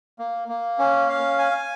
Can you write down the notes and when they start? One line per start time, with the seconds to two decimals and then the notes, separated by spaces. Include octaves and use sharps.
0.19 A#3
0.48 A#3
0.79 C#4
1.09 F5
1.39 G#5